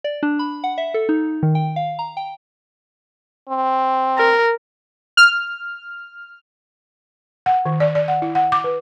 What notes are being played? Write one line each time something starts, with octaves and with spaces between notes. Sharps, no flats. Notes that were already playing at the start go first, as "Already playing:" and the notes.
D5
D4
B5
F#5
E5
A4
D#4
D#3
G5
F5
A#5
G5
C4
A#4
F6
F#5
D#3
D5
D5
F#5
E4
F#5
D6
B4